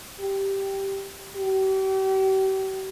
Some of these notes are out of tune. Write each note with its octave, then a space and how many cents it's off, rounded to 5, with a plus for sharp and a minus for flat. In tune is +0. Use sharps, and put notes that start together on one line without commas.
G4 -5
G4 -40